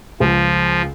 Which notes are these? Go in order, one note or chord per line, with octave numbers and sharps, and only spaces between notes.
C#2 F3